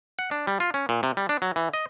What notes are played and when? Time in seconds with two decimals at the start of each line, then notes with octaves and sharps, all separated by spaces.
0.19 F#5
0.31 D4
0.47 G3
0.60 F4
0.74 C#4
0.89 A#2
1.03 C3
1.17 G3
1.29 D4
1.42 F#3
1.56 E3
1.74 D#5